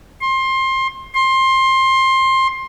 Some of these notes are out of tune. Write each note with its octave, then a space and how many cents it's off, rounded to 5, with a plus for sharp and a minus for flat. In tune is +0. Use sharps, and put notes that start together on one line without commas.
C6 +25
C6 +20